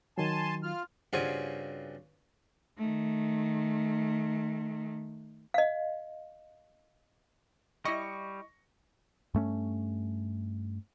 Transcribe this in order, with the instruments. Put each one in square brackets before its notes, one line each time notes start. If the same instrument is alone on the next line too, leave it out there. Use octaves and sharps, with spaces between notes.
[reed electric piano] D#3 F#3 [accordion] G#5 A5 C6
[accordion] F4 F6
[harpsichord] G2 C#3 C4 F4 F#4 G#5
[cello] D#3 A3
[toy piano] D#5 F5
[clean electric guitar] G3 [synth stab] E4 D#5 [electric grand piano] C#6 A#6 C#7
[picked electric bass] G2 A3 C#4